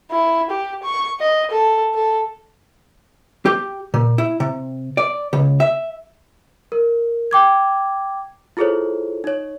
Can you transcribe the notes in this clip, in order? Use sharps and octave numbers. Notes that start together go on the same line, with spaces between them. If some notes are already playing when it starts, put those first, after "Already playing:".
E4
G4
C#6
D#5
A4
A4
G4
A#2
E4
C3
D5
C#2
E5
A#4
G5 D6 G#6
E4 F4 G#4 A4 C5 C#5
D#4 C#5